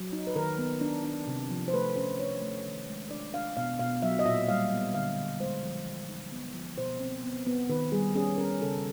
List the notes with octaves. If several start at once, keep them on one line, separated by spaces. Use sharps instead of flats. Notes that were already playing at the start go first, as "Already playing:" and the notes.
Already playing: F#3
D#4
B4
D#3 A#4
B3
D4
D4
C3
F3
C5
A3 B4
C#4 C5
D4 C#5
A3
D#3
G#3
D4 D5
D4 F5
B2 F5
B2 F5
F#3 E5
D#5
A#2 E5
G3 F5
B3
D3 F5
D3
G#3 C5
F3
E3
D#4
B3
F3
B2 C5
C4
B3
B3
D#3 B4
G3 G#4
C#4 G#4
C#4 A#4
C#3 A4